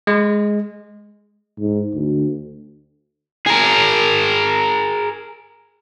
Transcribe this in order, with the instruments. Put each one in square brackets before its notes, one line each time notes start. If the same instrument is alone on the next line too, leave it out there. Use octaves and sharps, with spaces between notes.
[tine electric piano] G#3
[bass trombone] G#2
D2
[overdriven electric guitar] G#4 A#4